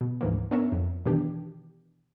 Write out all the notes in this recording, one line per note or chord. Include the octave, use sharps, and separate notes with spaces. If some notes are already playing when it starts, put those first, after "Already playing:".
B2
D2 G#2 E3 F3 A#3
B3 C#4 D4 A#4 C#5 E5
F2
B2 D#3 E3 D4 G4